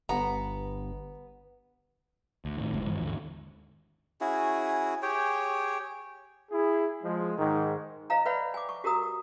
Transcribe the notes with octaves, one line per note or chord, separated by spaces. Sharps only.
G1 B3 A#5
D2
A2 D#3
F#1 D2 G#3
G2 D#3 E3 G#3
D#2 G#2 D3
C#4 E4 F#4 G#4
G4 G#4 C#5 G5
E4 G#4
F3 G#3
G#2 D#3
C5 D#5 F5 A#5
B4 C#5 D5 E5 F#5 B5
G#5 D6
C#6
F#4 G4 A#4 A#5 D#6